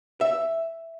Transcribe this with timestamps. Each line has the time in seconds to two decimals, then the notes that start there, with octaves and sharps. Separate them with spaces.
0.21 E5